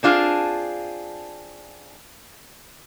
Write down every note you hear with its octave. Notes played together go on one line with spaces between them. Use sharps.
C4 D4 F4 G#4